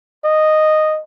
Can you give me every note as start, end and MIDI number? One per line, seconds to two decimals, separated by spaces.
0.24 1.00 75